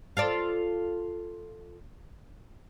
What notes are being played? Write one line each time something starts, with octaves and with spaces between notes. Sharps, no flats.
F4 A4 D5